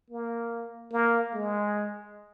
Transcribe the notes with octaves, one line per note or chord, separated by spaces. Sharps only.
A#3
A#3
G#3